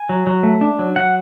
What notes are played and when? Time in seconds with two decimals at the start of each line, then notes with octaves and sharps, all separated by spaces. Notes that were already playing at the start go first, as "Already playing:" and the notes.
Already playing: G#5
0.09 F#3
0.27 F#3
0.43 A3
0.61 D4
0.79 F#3
0.96 F#3 F#5